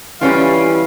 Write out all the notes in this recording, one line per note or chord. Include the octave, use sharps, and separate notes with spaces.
E3 G3 C#4 F4 F5